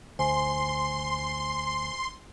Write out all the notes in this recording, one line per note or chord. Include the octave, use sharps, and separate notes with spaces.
D2 C5 G#5 C6